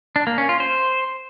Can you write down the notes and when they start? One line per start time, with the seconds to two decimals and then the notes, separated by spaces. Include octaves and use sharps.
0.16 D4
0.27 A#3
0.38 C#4
0.49 F4
0.60 C5